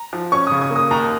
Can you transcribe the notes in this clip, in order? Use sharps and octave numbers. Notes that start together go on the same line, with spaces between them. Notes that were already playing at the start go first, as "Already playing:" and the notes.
Already playing: A#5
F3
C#4 C#6
C#3 D#6
D#6
A#3
D#6
D#2 A#5